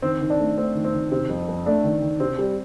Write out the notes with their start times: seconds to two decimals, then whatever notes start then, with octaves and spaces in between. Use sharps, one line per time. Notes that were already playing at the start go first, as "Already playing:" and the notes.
0.02 D#3 C4
0.21 D#3
0.30 D4
0.39 A3
0.57 A3 C4
0.75 D#3
0.85 C4
0.93 D#3
1.12 C3 C4
1.29 F2
1.48 F2
1.66 A3 D4
1.84 D#3
2.02 D#3
2.20 C3 C4
2.38 G3